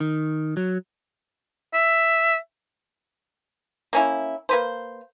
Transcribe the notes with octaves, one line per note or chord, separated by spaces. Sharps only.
D#3
F#3
E5
A#3 C#4 E4
A#3 B4 C5